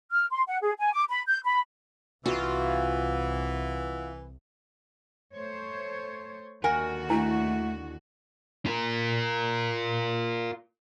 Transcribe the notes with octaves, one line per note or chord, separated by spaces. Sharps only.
F6
C6
F#5
G#4
G#5
D6
B5
G6
B5
C2 E3 F4 F#4
A3 C5 C#5
D#2 D3 F#4 A#4 F#5 G#5
A3 D4 E4
F4 A#4